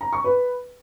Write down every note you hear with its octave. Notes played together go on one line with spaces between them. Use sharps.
A#5
C#6
B4